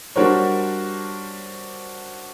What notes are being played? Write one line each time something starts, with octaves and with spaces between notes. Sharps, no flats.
G3 D4 F#4 A#4 C5 C#5